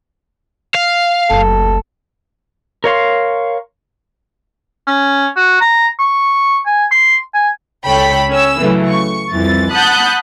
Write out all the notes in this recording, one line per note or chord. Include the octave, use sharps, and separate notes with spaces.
F5
F#1 D2 A4
A#4 C#5 F5 C6
C#4
F#4
A#5
C#6
G#5
C6
G#5
C#2 A4 C#5 G5 B5 B6
C#4 E6
C#3 E3 F#3 A3
C#6
C2 F2 E3 A6
F#5 A5 B5 D#6 F#6 G6